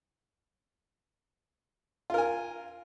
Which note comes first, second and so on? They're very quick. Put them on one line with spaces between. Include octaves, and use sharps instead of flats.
F4 A#4 G#5